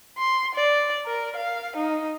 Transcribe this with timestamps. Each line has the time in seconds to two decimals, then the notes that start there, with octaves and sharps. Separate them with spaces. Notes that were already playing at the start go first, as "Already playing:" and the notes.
0.18 C6
0.56 D5
1.06 A#4
1.36 F5
1.77 D#4